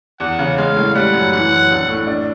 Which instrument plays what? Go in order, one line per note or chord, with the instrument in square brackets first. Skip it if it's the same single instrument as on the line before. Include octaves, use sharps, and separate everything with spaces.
[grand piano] E2 [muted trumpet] F#5
[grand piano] C#3
[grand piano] G#3 [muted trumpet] F5
[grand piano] A2
[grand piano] G3 [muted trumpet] F#5
[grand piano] F#2
[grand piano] E3 [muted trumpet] F#5
[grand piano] F#2
A#1
A2
D4